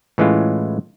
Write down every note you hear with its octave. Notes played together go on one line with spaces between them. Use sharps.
A2 E3 G#3 C#4 F4